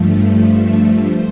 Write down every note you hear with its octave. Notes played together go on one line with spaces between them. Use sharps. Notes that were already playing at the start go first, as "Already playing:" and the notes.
Already playing: G2 F3 A3
E5
C5